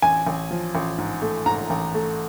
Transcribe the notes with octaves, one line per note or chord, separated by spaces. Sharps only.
A1 G#5
A1
F3
A1
G#2
A3
G#2 A#5
A1
A3